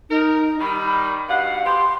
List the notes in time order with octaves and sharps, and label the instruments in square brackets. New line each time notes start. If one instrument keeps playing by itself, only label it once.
[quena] D#4 [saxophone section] A#4
[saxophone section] D#3 G3 [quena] B5
[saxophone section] G2 B2 F#5 [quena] F5
[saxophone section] F3 B3 G4 [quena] C6